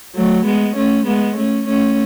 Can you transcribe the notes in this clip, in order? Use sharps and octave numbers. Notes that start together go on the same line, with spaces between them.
F#3 A3
G#3 B3
A3 C#4
G#3 B3
A3 C#4
A3 C#4